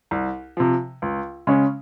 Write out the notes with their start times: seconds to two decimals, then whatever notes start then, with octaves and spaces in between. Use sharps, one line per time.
0.11 C2
0.57 C3 F3
1.02 C#2
1.47 C#3 G#3 C#4